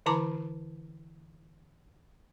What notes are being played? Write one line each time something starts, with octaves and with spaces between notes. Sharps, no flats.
D3 E3 E4 A5 A#5 D6